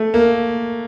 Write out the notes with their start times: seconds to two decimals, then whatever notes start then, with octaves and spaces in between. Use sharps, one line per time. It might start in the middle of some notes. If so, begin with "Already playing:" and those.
Already playing: A3
0.14 A#3